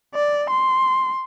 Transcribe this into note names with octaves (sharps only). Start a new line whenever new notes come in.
D5
C6